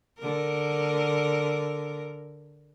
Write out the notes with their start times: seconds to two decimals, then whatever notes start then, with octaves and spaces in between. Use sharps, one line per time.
0.19 D3 A#4